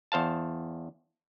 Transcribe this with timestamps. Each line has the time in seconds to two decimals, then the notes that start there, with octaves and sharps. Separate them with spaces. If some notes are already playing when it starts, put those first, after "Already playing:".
0.12 E2 C5 F5 A5